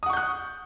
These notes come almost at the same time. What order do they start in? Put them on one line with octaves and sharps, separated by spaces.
D#6 F#5 C#6 G6 F#6